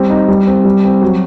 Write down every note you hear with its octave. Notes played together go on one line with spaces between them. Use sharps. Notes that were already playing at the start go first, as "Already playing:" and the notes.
Already playing: G3 C4
D#4
G3
C4
G3
C4
F#3